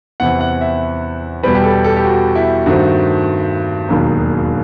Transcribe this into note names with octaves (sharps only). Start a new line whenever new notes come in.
E2 C3 E3 F#5
F#5
E5
E2 B2 G3 B4
G4
A4
A4
G4
F#4
E4
G2 D#3 A3 C4 F#4
E1 D#2 D#3 F#3